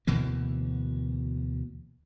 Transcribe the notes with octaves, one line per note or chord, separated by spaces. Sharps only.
D2 B2 E3 A#3